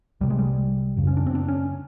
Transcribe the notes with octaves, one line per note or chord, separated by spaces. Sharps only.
C2 C3 G3
G#3
G3
F#2 C#3
C#4
D4
C4
D4
C#4